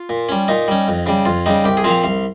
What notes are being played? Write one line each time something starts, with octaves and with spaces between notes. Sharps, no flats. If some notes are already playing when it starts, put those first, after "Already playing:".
Already playing: F4
A#2
G3 C#4
A#2 D#4
G3 C#4
F2
C#3 G3
F2 F4
C#3 G3 D#4
C2 G4
G#4
A#2 F3 C4
F5
C2 F5